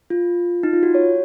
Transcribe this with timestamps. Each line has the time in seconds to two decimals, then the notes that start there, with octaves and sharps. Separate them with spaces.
0.10 F4
0.63 D#4
0.73 F4
0.83 F#4
0.95 C#5